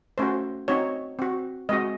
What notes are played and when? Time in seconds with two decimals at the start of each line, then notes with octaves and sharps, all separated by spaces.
0.18 A3 C#4 F#4 C5
0.68 C4 D#4 F#4 C#5
1.19 C4 F#4
1.69 G#3 C4 F#4 D#5